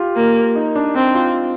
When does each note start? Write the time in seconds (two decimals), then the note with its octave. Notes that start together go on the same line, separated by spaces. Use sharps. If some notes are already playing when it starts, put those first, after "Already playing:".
Already playing: F4 G4
0.16 A#3
0.56 D#4
0.76 D4
0.95 C4 D4
1.14 F4